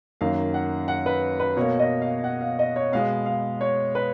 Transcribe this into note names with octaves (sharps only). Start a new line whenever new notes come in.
F#2 D#3 A#3 F5
F#5
F#5
B4
B4
B2 A#3 C#5
D#5
F5
F#5
F5
D#5
C#5
B2 G#3 B3 F5
F5
C#5
B4